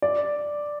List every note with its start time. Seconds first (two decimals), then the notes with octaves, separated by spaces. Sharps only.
0.02 D5